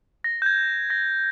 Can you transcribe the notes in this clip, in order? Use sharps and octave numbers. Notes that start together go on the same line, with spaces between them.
A#6
G6
G#6
A#6